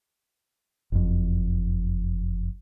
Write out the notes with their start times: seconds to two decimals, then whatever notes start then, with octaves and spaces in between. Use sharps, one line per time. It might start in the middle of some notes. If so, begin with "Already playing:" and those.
0.92 F#1 F2